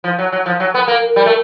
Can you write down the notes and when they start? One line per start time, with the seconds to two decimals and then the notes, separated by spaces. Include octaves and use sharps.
0.04 F3
0.18 F#3
0.32 F#3
0.46 F3
0.60 F#3
0.74 B3
0.88 A#3
1.16 G3
1.26 A3